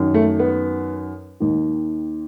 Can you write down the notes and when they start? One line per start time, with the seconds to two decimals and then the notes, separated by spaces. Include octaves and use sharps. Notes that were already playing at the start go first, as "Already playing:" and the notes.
Already playing: F#2 D#3
0.14 A3
0.39 B3
1.40 D#2 D#3